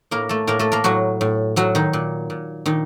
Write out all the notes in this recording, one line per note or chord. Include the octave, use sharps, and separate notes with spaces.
A2 A#3 A#4
A3 A4
A2 A#3 A#4
A3 A4
A#3 A#4
A2 F#3 F#4
A2
A2 F#3 F#4
D#3 D#4
A#2
A#2
A#2 D#3 D#4